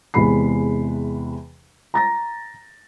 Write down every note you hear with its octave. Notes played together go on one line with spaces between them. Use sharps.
E2 C3 G#3 B5 C7
A#5 A6 A#6